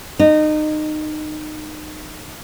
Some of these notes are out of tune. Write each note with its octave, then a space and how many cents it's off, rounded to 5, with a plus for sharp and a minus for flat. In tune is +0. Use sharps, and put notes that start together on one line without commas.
D#4 -25